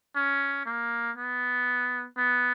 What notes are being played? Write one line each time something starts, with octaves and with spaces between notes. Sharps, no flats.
C#4
A#3
B3
B3